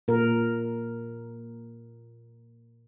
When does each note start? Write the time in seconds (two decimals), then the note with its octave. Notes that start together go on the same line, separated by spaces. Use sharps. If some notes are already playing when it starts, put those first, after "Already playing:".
0.08 A#2 A#4